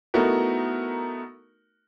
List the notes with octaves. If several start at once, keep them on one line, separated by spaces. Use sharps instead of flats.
A3 B3 D#4 E4 F#4 A#4